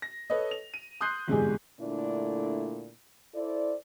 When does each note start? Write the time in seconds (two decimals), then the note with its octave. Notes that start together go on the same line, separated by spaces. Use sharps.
0.02 A#6
0.30 A4 B4 C#5 D#5
0.51 F7
0.74 D#7
1.01 C6 D#6 F#6 G6 C7
1.27 G1 E2 G#2 C3 G#3 G#4
1.80 A#2 D3 A3 D4 E4
3.34 E4 A4 C5 D5